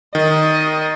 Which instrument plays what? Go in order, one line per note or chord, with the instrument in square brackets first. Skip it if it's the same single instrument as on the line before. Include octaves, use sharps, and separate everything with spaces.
[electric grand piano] D#3 [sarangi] D#5